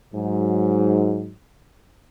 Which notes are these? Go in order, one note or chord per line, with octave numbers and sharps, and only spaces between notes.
G#2 F#3